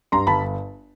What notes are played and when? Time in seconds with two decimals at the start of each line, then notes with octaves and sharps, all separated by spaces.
0.12 G2 A#5 C6
0.27 G1 A5 B5